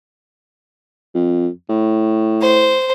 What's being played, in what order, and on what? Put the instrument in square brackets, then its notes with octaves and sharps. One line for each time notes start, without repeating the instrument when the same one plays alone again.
[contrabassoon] F2
A2
[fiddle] C5